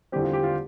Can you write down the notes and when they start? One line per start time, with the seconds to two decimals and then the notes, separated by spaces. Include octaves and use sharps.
0.12 E2 D3 G3 C4 G4
0.23 F4
0.33 G4
0.43 F4